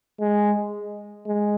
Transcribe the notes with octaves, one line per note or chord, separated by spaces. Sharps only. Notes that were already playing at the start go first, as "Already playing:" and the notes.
G#3
G#3